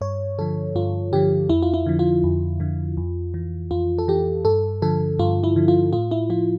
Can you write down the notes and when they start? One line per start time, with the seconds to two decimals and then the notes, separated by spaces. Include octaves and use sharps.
0.01 G2 C#5
0.39 D3 F3 A4
0.75 G2 F4
1.13 D3 F3 G4
1.49 F2 E4
1.62 F4
1.74 E4
1.86 D3 F3
1.99 F4
2.24 F2
2.60 D3 F3
2.97 F2
3.34 E3
3.71 F2 F4
3.99 A4
4.08 E3 G4
4.45 G2 A4
4.82 D3 F3 A4
5.19 G2 F4
5.44 E4
5.56 D3 F3
5.68 F4
5.93 A2 F4
6.11 E4
6.30 F3 F4